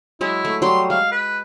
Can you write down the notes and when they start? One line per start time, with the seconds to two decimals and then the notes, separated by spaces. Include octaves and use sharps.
0.21 F#3 G#3 E4
0.45 A3
0.62 F#3 G3 G5 C6
0.90 G#3 F5
1.11 B4